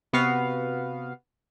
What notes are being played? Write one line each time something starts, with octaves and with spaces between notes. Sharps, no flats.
C3 B3 F#4 F5